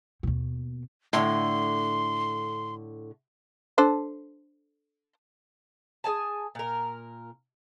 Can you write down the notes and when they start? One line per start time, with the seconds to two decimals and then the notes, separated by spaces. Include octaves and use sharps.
0.23 D#2 B2
1.13 A2 D3 C6
3.78 D4 A4 C5
6.04 G#4 A4 G#5 A5
6.55 A#2 A#4